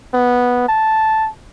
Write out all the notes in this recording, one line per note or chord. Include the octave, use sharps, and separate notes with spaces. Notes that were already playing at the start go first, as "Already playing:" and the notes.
B3
A5